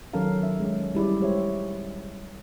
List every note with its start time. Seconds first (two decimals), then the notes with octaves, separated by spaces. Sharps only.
0.13 D#3 F#3 C#4 A4 A#4 F5
0.42 C#4 E5
0.60 G#3 C#4
0.95 G3 E4 G#4 D5
1.20 G#3 G4 C5 C#5 E5